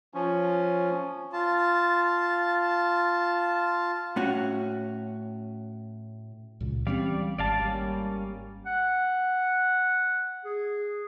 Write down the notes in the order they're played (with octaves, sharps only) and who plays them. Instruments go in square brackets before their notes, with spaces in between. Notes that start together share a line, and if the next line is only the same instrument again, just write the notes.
[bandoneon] F3 C#4
[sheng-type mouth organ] F4 A5
[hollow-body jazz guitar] A2 C#4 F#4
[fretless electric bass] C#2 A#2 C#3
[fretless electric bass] E3 C4 C#4 [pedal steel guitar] G3 D5 F5
[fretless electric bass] G#1 [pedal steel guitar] D5 F5 A5
[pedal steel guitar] G3 A#3 C#4
[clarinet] F#5
G#4